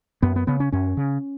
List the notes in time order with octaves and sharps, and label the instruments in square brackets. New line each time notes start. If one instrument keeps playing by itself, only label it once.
[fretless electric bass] F#2 B3
B3
C#3 B3
C#4
F#2 C#4
C#3